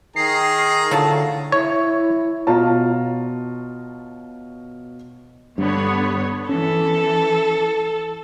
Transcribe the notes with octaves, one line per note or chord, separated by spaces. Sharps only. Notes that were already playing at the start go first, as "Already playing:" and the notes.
D#3 G#4 A#5 C7
A2 D3 F#3 F4 A5
E4 C#5
B2 F4 C#5 A5 A#5
G2 D3 B3 C#5
E3 C#4 A4